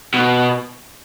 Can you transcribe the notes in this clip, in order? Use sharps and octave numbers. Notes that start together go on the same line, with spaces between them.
B2